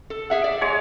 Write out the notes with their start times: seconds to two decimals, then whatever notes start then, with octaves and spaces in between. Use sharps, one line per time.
0.10 A4
0.30 G#4 E5 F#5
0.44 D5
0.61 G#3 C#5